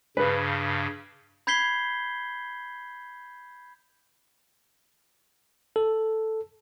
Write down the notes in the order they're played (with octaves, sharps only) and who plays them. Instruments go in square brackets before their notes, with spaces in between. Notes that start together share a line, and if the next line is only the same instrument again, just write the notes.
[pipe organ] G2 C#3 [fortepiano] B4
[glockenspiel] B5 G6 G#6 B6 C7 G7
[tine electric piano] A4